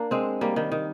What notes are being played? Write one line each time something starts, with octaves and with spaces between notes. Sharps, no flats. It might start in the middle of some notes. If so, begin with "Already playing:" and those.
Already playing: A#3 D4
G#3 C4
G3 A#3
D#3 G3
D#3